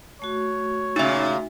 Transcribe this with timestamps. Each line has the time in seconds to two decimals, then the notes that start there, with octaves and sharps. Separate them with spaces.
0.22 A3 F#4 C#5
0.96 A#2 C#3 D#4 E5